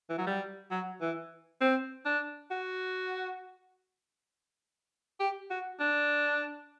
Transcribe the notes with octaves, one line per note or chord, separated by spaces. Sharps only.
E3
F#3
G3
F#3
E3
C4
D4
F#4
G4
F#4
D4